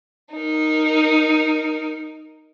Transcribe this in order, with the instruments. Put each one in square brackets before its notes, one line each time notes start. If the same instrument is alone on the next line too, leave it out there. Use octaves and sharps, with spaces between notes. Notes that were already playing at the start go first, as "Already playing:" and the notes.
[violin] D#4 A#4